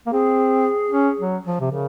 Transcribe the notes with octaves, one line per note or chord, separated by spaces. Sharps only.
A#3
C4 G#4
C#4
F#3
F3
C3
C#3 A#4